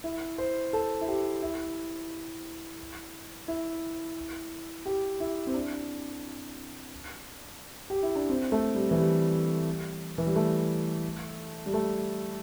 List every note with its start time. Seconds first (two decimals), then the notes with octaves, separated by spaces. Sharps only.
0.04 E4
0.38 C5
0.73 A4
1.01 E4
1.08 G4
1.42 E4
3.48 E4
4.86 G4
5.20 E4
5.47 C4
5.54 D4
7.90 G4
8.03 E4
8.15 D4
8.29 C4
8.52 A3
8.75 G3
8.91 E3
8.98 G3
10.18 E3
10.26 G3
10.36 A3
11.66 G3
11.74 A3